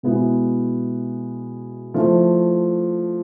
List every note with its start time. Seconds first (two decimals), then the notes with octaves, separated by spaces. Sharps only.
0.03 B2 G#3 B3 E4
1.94 F3 A3 E4